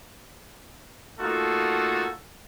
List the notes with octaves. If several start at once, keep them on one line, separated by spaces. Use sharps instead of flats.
A3 A#3 D#4 F4 F#4 A4